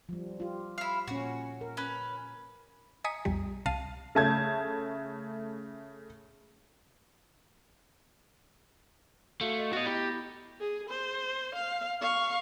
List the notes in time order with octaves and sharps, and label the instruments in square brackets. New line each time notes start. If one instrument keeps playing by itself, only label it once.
[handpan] F3 G3
F4 G4
[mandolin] E4 F5
[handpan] A#2 C#4 [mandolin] F#4
[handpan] A#4
[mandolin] C#4 B4
[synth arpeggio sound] D#5 G#5 A#5 D#6 B6 C#7
B1 F2 G3
C2 F5 A5 C7 D#7
[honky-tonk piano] C#3 A3 A5 G6 G#6
[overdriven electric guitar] A3 [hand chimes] F#4 F5
[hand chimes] D#5
[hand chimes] B3 A6 A#6 [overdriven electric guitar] F#4 D#5
[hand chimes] E4 B5 [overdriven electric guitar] G4
[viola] G#4
C5
F5
F5 C#6